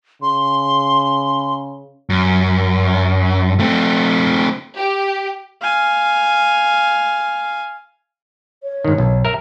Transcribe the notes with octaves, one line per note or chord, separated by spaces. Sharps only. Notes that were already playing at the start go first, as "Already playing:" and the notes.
C#3 C6
F#2
A3 C4
G4
F5 G#5
C#5
G#2 D#3
B1
A#4 E5